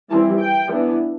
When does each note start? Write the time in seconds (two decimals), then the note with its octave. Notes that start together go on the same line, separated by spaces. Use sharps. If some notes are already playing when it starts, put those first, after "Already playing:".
0.10 E3 G3 C4 A5
0.40 G5
0.69 E3 B3 D4